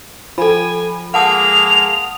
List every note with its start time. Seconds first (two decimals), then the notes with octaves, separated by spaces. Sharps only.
0.38 F3 A4 G#5 B5
1.14 G#3 A#3 F#5 A5 D#6 F7